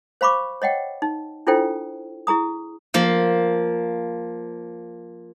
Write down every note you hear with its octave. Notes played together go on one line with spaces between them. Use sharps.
C5 F5 B5 C#6 D6
C#5 D#5 F#5 G5
D#4
D4 E4 F4 A4 C5 G5
E4 G#4 A#5 D#6
F3 A#3